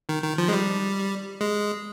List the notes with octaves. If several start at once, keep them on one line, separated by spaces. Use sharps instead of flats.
D#3
D#3
F3
G#3
G3
G#3